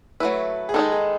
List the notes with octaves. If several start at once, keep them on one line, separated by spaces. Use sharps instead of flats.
F#3 A3 E4 B4
G#4
D#3 G#3 D#4 A4
G#4